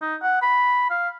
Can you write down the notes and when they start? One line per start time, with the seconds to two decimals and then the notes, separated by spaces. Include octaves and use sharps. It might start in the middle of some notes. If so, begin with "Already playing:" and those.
0.02 D#4
0.22 F#5
0.42 B5
0.90 F5